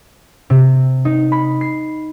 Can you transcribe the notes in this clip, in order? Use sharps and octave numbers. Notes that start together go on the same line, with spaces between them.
C3
D#4
B5
C7